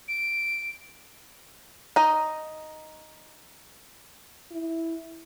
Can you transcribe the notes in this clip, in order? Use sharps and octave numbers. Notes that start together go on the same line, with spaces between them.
D7
D#4 D#5
E4